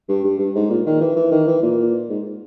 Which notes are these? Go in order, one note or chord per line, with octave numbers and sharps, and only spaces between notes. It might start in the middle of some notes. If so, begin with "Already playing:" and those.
G2
G2
G2
G#2
A#2
D#3
E3
E3
D#3
E3
A#2
G#2